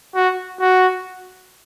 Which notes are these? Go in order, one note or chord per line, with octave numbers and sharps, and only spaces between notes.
F#4
F#4